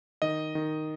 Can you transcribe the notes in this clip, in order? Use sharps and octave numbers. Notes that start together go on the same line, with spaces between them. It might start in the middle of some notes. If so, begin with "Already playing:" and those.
D#3 D#5
D#3